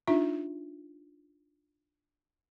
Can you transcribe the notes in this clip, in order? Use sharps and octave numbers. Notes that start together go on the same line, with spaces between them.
D4 D#4 F4 E5